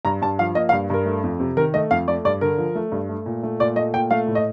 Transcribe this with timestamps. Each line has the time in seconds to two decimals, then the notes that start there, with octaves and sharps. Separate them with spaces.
0.05 G2 A#5
0.22 G2 A5
0.39 F3 F5
0.55 A#3 D#5
0.69 F5
0.72 G2
0.90 G2 A#4
1.06 A3
1.23 F2
1.40 C3
1.57 D#3 A#4
1.74 A3 D#5
1.91 F2 F5
2.08 A3 D5
2.25 G2 D5
2.41 D3 A#4
2.58 F3
2.75 A3
2.92 G2
3.09 A3
3.26 A#2
3.43 A3
3.60 A#2 D5
3.76 A3 D#5
3.94 A#2 G5
4.11 A3 F5
4.28 A2
4.35 D#5